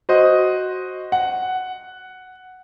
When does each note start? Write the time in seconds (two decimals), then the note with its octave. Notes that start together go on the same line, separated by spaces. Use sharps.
0.09 F#4 C5 D#5
1.12 F#5